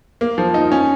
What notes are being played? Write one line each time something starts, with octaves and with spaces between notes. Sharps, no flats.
A#3
F3
D#4
C#4